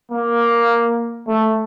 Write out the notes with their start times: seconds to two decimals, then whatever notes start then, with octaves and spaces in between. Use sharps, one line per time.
0.11 A#3
1.28 A3